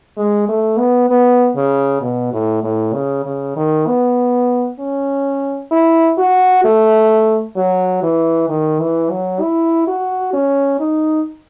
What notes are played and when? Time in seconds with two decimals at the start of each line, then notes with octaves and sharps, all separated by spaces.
0.18 G#3
0.49 A3
0.79 B3
1.10 B3
1.56 C#3
2.02 B2
2.33 A2
2.64 A2
2.94 C#3
3.25 C#3
3.57 D#3
3.87 B3
4.80 C#4
5.72 E4
6.18 F#4
6.65 A3
7.57 F#3
8.03 E3
8.49 D#3
8.80 E3
9.11 F#3
9.41 E4
9.88 F#4
10.34 C#4
10.80 D#4